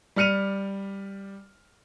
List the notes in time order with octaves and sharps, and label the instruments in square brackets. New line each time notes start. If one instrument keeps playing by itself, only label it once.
[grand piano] G3 D5 F6 C#7 D#7 F7